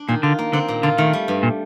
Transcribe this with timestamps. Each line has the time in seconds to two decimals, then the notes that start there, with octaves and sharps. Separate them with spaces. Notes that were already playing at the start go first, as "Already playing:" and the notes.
Already playing: D4
0.08 A#2 D#3
0.23 D3 F4
0.39 A#3
0.53 D3 C4
0.68 A#2
0.83 D3 F4
0.98 D#3 A3
1.13 G3
1.28 G2
1.43 A#2